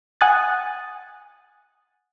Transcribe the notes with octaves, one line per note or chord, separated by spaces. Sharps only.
F#5 G#5 D#6 F#6 A6